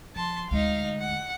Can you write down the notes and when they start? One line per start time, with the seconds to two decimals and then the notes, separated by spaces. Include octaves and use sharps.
0.15 F3 A5 C6
0.51 D2 G#3 D#4 F5
0.99 F#5